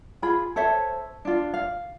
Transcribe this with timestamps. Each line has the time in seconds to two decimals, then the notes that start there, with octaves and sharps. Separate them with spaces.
0.22 F4 G#4 B5
0.56 A4 C5 C#5 E5
1.25 D4 F4
1.54 F5